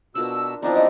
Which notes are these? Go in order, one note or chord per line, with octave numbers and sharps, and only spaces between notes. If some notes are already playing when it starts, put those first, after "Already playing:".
B2 D4 F4 A#4 E6
E3 F3 B3 C4 D4 D#4
G3 D#5